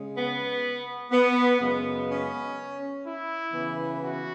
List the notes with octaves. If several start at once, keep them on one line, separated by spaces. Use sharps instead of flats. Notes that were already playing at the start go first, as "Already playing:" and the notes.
Already playing: C#3 G#3
B3
B3
F#2 C#3 G#3 B3
C#4
E4
C#3 E3 B3
F#4